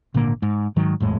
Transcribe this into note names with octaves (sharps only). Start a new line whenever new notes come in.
G#1 A#2 D3 A#3
G#2
G#2 D#3 F#3
G#1 F2 A2 G#3